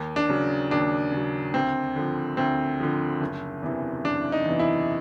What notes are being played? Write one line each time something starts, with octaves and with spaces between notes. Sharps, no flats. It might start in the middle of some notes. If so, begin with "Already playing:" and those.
Already playing: D#2
D4
C#3 F#3
D#2 D4
C#3 F#3
D2 C4
D3 F3
D2 C4
D3 F3
F#1
E2 C3 E3
F#1 D4
D#4
E2 C3 E3
E4